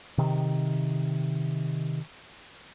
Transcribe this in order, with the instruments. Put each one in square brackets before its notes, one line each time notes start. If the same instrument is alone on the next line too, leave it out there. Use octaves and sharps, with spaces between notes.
[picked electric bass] C3 D#3